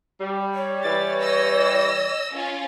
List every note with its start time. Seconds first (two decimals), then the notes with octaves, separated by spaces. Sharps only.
0.21 G3
0.54 C#5
0.85 E3 G3 A6
1.21 D#5 E6 A#6
2.34 C#4 F4